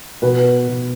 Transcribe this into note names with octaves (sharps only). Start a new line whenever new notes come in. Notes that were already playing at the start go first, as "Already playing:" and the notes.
B2 B4
B2